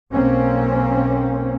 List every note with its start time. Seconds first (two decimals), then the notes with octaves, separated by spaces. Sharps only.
0.11 B1 A#3 C4 C#4